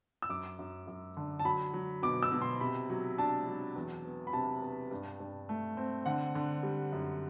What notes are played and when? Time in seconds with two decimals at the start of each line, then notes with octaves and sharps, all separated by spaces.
0.22 E6
0.29 F#2 D6
0.59 F#2
0.87 F#2
1.17 D3
1.39 A5
1.45 F#3 B5
1.74 F#3
2.02 B2 D6
2.23 E6
2.32 B2
2.42 C6
2.60 C3 B5
2.89 F#3
3.18 D4 A5
3.47 F#3
3.76 E2
4.05 B3
4.27 B5
4.33 C3 A5
4.62 B3
4.91 G2
5.20 G2
5.49 A3
5.77 C4
6.06 D3 F#5
6.35 D3
6.63 G3
6.92 F#2